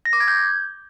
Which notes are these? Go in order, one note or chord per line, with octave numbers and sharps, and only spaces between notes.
A#6
D6
G#6
G6